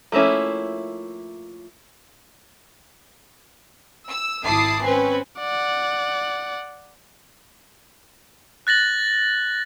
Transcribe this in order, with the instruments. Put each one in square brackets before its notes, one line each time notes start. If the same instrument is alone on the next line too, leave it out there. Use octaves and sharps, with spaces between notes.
[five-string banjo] F3 A3 A#3 C#4 E4
[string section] E6
G#1 E4 A5 D6 D#6 C7
C4 C#4 B4 G#5
[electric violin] D5 F#5
[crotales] F#6 A6 A#6 F#7